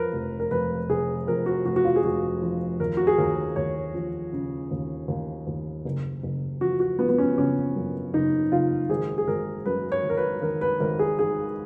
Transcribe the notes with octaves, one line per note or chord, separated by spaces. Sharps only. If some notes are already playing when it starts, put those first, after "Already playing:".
Already playing: F2 A#4 B4
F1
A#4
F1 B4
F1 G#4
F2 A#4
F#4
F1 F#4
F#4
F4
G#4
F1 F#4
F3
D#2 A#4
F#4
G#4
D#2 A#4
D#2 C#5
F3
C#3
D#2
D#2
D#2
F#1
F#1
F3 F#4
F#4
F3 B3
B3
C#4
F#1 C#4
F#2
F#1 D#4
F#1 F4
G#1 G#4
G#4
G#1 A#4
F#2 B4
C#5
G#1
A#4
B4
D#3 A#4
B4
G#1 A#4
G#4
D#3 G#4